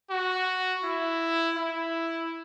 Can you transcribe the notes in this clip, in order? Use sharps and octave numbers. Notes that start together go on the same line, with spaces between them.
F#4
E4
E4